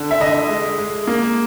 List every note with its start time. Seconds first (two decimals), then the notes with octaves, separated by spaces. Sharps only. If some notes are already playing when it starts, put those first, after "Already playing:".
Already playing: D3
0.11 E5
0.20 D3 D#5
0.49 G#3
0.78 G#3
1.07 A#3